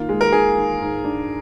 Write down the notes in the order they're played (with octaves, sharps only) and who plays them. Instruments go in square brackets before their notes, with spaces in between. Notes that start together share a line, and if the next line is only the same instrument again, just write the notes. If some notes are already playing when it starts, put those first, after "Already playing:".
Already playing: [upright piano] D#3 A#3 [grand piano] F4
[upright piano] G#3
[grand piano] A#4
[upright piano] D#3 [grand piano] G#4
[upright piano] D#3
G#2
D4